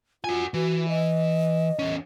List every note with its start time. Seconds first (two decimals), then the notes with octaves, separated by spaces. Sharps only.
0.24 F4 F#4 G#5
0.54 E3 F#4
0.89 D#5
1.79 E2 C#4